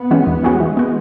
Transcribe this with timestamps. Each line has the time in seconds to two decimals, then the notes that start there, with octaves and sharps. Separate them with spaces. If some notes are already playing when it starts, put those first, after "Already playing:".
Already playing: B3
0.11 E3 G#3 C#4 F#4
0.27 E2
0.43 E3 G#3 C#4 F#4
0.60 E3 G#3
0.77 B3 F#4